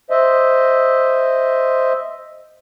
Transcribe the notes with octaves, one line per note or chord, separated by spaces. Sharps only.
C5 D#5 E5